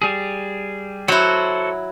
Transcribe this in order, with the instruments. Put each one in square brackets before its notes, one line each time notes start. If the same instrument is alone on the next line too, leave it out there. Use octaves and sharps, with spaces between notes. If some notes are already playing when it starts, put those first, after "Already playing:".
[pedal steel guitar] G3 G#4
[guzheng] F#3 E4 [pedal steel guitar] F#4 A4 C5